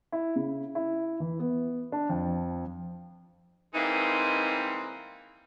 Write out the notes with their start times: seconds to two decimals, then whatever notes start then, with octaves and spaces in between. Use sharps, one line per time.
0.12 E4
0.36 C#3
0.75 E4
1.20 E3
1.39 B3
1.92 D4
2.09 F2
3.75 E3 G3 G#3 A#3 C4 D#4